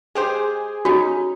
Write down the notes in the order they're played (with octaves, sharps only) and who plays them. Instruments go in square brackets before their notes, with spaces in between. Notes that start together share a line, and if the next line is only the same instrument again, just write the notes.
[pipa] G#3 G4 C5 [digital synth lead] G#4
[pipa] C#4 D#4 [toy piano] F#4